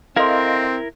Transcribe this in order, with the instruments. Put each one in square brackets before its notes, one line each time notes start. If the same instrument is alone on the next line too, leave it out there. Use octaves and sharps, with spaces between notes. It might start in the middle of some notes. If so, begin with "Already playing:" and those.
[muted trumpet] C4 [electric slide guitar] E4 A#4 [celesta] A4 C6 [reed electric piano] D#5 F5